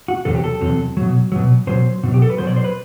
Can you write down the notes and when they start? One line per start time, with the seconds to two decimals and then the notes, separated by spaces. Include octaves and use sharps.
0.08 F#4
0.25 E2 C3 F#3 A4
0.35 G4
0.44 A4
0.61 E2 C3 F#3
0.97 B2 F#3
1.32 B2 F#3
1.67 B2 F#3 C5
2.04 B2 F#3
2.14 G4
2.22 A4
2.30 B4
2.38 B2 F#3 C5
2.47 D5
2.56 C5
2.64 B4